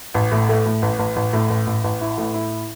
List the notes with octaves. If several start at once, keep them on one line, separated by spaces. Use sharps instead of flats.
A1
A2
A3
A2
A1
A1
A1
A2
A1
A1
A1
E4
A2
E4